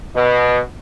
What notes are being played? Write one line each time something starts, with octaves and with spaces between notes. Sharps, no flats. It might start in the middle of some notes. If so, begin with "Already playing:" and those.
B2